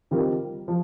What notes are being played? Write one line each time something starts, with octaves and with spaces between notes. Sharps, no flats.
D#3 G3 C4 F4 A#4
F3